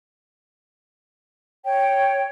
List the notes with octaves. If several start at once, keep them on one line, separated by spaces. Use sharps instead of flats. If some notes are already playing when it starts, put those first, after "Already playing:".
C#5 G5